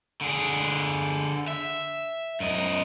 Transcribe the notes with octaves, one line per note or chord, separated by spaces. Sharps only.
D3 G#4
E5
F#2 D#5